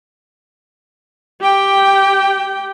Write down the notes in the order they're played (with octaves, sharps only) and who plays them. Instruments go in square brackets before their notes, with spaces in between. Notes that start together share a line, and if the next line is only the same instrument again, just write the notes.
[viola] G4 G5